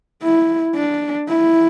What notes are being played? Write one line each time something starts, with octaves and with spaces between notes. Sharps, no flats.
E4
D4
E4